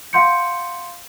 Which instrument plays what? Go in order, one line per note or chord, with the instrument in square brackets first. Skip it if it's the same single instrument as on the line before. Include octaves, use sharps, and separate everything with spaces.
[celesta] F5 F#5 C6 G6 C#7